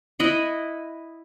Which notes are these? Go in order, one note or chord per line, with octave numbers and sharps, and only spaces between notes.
E4 D#5 F#5